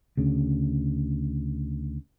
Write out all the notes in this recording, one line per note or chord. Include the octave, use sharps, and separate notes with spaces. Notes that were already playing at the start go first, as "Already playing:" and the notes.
D2 C#3